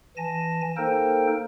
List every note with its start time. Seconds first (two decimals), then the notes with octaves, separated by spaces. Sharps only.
0.17 E3 G#5 A5 A#6
0.77 A#3 D#4 A4 A#4 C5 G5